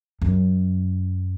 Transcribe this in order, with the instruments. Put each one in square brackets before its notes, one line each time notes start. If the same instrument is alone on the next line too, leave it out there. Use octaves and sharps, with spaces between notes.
[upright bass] F#2